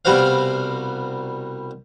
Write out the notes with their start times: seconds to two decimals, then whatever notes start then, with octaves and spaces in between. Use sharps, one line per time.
0.05 C2 B2 G3 F#4 C5 F5